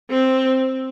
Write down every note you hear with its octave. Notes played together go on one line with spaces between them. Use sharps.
C4